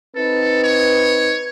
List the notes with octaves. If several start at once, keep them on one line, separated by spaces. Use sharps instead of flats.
C4 D#4 A4 B4
C#5